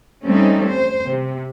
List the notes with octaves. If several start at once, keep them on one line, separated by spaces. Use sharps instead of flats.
G3 A3 C4 C#4 D#4
C5
C3